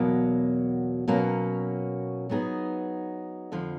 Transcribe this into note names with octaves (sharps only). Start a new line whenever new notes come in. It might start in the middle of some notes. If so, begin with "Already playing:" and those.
Already playing: E2 B2 F#3 A#3
B2 F#3 A#3 C#4
F#3 B3 D#4 G#4
F2 D3 F3